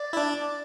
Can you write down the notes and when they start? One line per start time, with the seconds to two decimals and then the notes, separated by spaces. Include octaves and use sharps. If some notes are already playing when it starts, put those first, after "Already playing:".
Already playing: D5
0.13 E4
0.17 D4